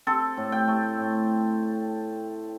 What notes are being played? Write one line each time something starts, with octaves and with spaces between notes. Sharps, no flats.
C4 A4
A2
G5
A3
A2